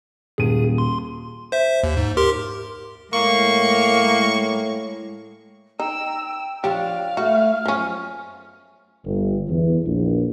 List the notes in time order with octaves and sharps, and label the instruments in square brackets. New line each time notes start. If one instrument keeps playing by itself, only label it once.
[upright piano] D#1 D#7 [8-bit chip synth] G#4
[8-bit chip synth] C6
C5 E5
D#2
G#2
G4 A#4 C6
[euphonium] A2 [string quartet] G#3 [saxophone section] A#3 [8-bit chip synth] C#6
[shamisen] D#4 [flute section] G5 A#5 [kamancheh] E6
[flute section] G5
[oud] F3 D4 C#5 [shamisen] G4 [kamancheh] F5
[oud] A3 E4 [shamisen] F#4 [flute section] F6
[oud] F#2 [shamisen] F3 C#4
[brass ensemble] G1
E2
A#1